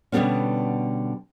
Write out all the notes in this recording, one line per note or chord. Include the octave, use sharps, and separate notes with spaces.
B2 D3 G3 A3 B3 C#4